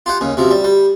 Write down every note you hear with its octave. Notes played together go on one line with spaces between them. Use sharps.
F4 G4 F#5
D#2 C#3
C3 F3 F#3
G3
G3